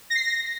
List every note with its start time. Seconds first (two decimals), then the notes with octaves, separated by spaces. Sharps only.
0.10 A#6
0.15 C7
0.20 A#6